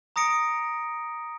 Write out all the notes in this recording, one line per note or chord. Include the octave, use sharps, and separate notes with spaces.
A#5 D#6 A#6 C#7 D7